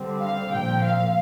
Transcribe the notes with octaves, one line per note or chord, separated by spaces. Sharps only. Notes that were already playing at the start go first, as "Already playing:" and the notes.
Already playing: D3 G3 C4
F5
A#2 F3 C4 G5
F5